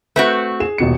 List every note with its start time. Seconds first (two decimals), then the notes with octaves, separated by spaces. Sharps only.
0.16 A3 C4 F#4 B4
0.60 G#4 E7
0.78 D#1 B2 C#7